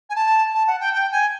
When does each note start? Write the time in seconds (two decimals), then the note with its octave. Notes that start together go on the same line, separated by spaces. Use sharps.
0.10 G#5
0.16 A5
0.54 A5
0.67 F#5
0.80 G5
0.94 G5
1.12 G#5